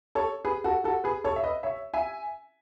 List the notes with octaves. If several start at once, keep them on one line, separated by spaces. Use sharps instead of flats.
A4 C#5
G#4 B4
F#4 A4
F#4 A4
G#4 B4
A4 C#5
E5
B4 D#5
C#5 E5
E5 G#5